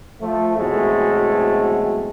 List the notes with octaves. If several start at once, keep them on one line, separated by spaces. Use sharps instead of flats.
F3 A3
B2 E3 F#3 G#3 A3 C4